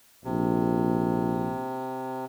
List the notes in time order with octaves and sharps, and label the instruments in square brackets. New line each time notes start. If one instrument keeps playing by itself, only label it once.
[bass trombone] A#1 [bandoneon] C3